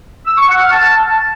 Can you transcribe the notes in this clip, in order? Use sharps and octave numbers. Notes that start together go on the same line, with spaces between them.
E6
C#6
F#5
F6
A5